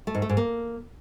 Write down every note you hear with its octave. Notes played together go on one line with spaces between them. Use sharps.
A3
G#2
A3
G#2
A#3